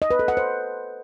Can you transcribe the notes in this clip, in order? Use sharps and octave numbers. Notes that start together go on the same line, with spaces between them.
D#5
B4
A4
F#5
C5